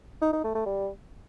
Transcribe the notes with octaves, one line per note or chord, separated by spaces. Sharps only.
D#4
D#4
A3
A3
G3